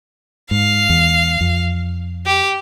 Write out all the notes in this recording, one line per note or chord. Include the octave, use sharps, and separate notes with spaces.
G#2 F5
E2
F2
G4